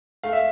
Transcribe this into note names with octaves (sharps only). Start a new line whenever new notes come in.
A3 F5
E5